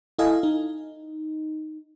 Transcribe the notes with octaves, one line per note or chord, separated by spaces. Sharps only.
E4 A4 D#5 F5 G#5
D#4